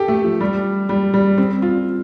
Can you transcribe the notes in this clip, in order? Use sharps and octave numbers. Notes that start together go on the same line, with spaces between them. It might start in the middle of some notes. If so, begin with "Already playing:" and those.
Already playing: G4 A4
A3
F3
G3
G3
G3
C4
F4